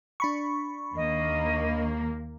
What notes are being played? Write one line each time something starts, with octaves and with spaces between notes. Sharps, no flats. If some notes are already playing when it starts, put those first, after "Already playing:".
D4 B5 C#6
D#2 A#3 D#5